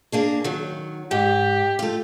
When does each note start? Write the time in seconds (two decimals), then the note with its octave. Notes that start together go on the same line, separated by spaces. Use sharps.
0.12 A#3 D4 G#4
0.44 D#3 F#3
1.11 G#2 G4
1.79 A3 F4